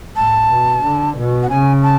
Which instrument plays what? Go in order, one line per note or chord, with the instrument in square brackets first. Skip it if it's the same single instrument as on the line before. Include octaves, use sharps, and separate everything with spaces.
[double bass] A2 [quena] A5
[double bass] B2
D3
B2
[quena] F#5
[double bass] C#3 [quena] G#5
[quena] A5